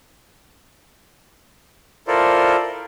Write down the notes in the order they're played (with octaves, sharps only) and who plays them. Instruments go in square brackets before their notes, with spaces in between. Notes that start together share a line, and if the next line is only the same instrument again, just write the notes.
[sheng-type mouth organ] E4 F4 A4 A#4 C5 D5